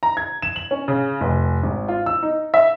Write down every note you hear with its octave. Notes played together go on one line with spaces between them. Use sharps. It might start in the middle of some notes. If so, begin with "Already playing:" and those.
A#5
G#6
E7
F#7
C#4
C#3
F1
G#1
F4
E6
D#4
E5